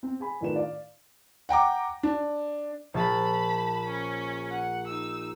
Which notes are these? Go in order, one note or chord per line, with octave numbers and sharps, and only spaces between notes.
C4
G#4 G#5 B5
A2 D#3 D4 F4 B4 E7
D5 F5
F#5 G5 A#5 D6
D4
A#1 A5 B5 A6
C#4
F#5
D#4 E6